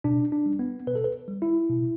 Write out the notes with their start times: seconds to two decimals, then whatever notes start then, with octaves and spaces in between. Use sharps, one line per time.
0.04 B2 D4
0.32 D4
0.46 G3
0.59 B3
0.87 B2 B4
0.95 A4
1.04 B4
1.28 G3
1.42 E4
1.69 B2